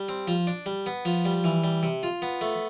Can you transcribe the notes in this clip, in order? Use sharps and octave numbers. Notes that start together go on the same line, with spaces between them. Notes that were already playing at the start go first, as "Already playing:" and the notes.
Already playing: G3
C4
F3
D4
G3
B3
F3
G3
E3
G3
C3
F4
B3
A3